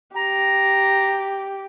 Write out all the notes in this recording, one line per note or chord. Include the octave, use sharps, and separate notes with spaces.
G4 A#5